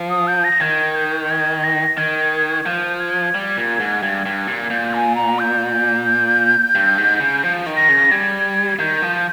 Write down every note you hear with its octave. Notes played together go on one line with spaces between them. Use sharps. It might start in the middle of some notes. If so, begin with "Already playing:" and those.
Already playing: F3
D#6
G6
A#6
D#3 G#6
G6
G6
G#6
A#6
D#3 G#6
F3 G6
G#6
G3
A#2
G#2
G2 G#6
G2
A#2
A#2 G6
G#5
A#5
G6
G2
G#2
C#3
F3
D#3
A#6
C#3
G3 G#6
D#3 G6
F3